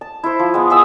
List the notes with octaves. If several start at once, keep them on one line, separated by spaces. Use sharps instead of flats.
A5
E4 C5
F3
G#3 B3
G#4 E5 D#6 E6